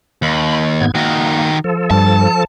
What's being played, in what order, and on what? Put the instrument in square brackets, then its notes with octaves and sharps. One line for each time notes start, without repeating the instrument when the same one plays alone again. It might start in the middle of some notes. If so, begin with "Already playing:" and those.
[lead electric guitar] D#2 [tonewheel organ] B5
[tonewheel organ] G#2 B3 G#6
[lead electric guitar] D#3 F#4 [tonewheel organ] A#3
[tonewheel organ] F3 A4
[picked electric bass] G2 [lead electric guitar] A5